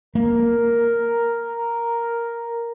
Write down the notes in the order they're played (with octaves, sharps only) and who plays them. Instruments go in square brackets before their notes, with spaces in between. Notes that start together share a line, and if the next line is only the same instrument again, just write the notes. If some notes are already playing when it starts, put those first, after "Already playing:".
[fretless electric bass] A#3 [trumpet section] A#4